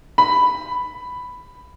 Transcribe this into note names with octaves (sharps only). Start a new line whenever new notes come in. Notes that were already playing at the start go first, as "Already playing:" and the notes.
B5